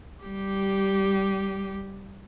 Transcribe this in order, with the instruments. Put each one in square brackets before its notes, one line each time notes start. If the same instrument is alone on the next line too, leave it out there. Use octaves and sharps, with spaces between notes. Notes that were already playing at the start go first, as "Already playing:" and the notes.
[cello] G3 G4